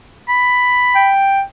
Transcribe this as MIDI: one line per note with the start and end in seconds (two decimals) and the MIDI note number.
0.29 1.09 83
0.95 1.41 79